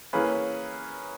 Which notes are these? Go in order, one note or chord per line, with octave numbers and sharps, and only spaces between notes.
E3 A#3 C#4 G#4 B4